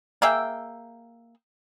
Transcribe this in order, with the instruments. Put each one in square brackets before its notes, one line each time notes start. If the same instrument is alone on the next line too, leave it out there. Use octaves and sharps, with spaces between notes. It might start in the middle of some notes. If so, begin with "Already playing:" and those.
[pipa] A#3 G#4 E5 G5